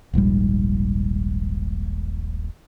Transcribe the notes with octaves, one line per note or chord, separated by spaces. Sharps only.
D#1 A#1 G#2 G3